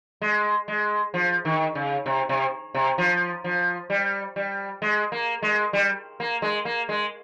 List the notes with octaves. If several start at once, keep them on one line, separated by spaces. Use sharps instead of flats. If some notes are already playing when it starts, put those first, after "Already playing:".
G#3
G#3
F3
D#3
C#3
C3
C3
C3
F3
F3
G3
G3
G#3
A#3
G#3
G3
A#3
G#3
A#3
G#3